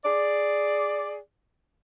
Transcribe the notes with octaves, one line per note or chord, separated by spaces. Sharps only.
G#4 D5